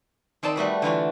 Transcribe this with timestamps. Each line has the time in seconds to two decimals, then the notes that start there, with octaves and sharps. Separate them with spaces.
0.43 D#3 C4 D5 A5 C6
0.56 G3 A3 F#4 B4
0.82 D3 E3 F4 F#4